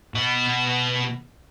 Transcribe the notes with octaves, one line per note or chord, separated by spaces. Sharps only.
B2 D#5